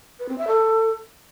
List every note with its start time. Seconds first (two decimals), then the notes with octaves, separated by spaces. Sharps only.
0.19 B4
0.29 C4
0.38 E5
0.47 A4